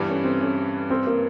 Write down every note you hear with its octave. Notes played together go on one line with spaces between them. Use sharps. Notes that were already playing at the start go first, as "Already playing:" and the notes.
Already playing: G2 E3 G3 B3
C#4
C4
C#4
C4
A#3